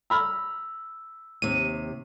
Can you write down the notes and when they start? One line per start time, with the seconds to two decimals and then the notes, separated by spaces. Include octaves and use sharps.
0.10 A#5 B5 E6 F6
1.42 D#2 C3 D#7